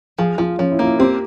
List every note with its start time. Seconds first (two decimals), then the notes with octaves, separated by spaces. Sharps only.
0.18 F3 G#4
0.38 F3 F4
0.59 F3 C#4
0.72 E4
0.79 A#3 F4
0.86 E4
0.99 C4 G4